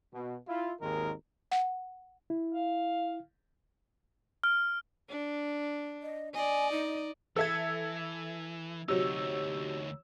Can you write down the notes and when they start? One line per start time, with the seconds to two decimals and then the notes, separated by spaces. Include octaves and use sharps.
0.13 B2
0.48 E4 F4
0.81 G#1 D#2 D#3 G#3 A#4
1.52 F#5
2.30 E4
2.54 F5
4.44 F6
5.09 D4
6.02 D#5
6.34 D5 D#5 G#5
6.72 D#4
7.37 E3 A4 E5 E6 G#6
8.89 D2 C3 F#3 D#4 C#5 E6